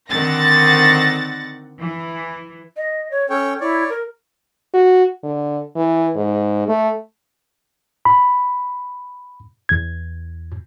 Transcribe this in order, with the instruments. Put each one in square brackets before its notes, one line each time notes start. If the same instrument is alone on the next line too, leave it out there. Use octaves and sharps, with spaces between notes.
[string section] D3 D#3 C4 F#5 A6 A#6
E3
[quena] D#5
C#5
[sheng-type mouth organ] C#4 C#5 G5 [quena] A4
[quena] E4 [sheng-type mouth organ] C#5 D5
[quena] A#4
[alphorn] F#4
D3
E3
G#2
A3
[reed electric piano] B5
E2 G#6